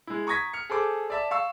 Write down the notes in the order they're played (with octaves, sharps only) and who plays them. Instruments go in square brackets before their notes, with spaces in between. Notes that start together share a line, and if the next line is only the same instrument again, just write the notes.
[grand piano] G#3 E4
A#5 C#6 D#6 G#6 A#6 B6
F6 C#7
G#4 A4 C5 D6
D5 E5 A5
F5 C#6 E6